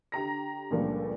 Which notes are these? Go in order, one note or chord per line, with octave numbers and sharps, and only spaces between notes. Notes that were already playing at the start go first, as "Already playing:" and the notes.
D3 G4 A#5 A#6
C#2 G2 A#2 F3 G3 A3